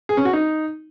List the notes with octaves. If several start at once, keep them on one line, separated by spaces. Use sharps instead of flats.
G#4
C#4
F#4
D#4